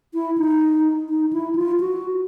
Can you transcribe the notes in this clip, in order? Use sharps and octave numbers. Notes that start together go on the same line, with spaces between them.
E4
D#4
D#4
E4
F4
F#4